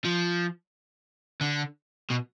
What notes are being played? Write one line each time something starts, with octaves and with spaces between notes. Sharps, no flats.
F3
D3
B2